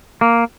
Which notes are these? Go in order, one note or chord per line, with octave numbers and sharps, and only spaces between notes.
A#3